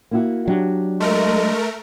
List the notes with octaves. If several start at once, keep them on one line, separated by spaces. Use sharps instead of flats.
A#3 E4 F#4
F#3 D4 G4
G#3 A3 A#4